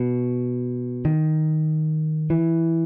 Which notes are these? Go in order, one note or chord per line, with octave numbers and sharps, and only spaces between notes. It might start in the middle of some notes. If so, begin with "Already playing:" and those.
Already playing: B2
D#3
E3